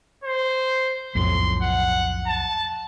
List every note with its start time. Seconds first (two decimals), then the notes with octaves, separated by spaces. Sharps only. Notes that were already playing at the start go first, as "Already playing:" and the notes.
0.24 C5
1.15 B1 F2 A2 C6
1.62 F#5
2.27 A5